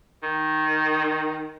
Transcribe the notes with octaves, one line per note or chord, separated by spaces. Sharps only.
D#3